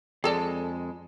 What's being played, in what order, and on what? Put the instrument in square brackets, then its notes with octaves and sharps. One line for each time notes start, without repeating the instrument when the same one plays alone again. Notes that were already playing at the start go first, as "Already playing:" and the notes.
[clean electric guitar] F2 G#3 [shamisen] G#4 A4 D5